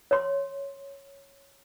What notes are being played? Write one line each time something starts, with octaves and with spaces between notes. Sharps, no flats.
C#5 C6